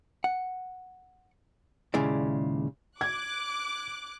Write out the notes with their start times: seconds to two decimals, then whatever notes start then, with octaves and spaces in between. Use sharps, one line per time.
0.24 F#5
1.94 D#2 A#2 C#3 G#3 E4 D5
3.01 D6 F#6 G#6